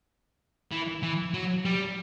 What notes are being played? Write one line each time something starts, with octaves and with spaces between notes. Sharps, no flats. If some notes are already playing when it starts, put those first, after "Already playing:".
E3
E3
F#3
G3